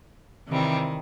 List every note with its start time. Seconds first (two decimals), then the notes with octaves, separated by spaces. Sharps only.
0.49 C3 D#3 E3 G3 C4